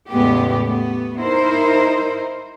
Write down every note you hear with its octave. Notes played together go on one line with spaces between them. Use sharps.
E2 A2 C#3 G#3 B3 G4
A3 B3
D#4 E4 A#4 C5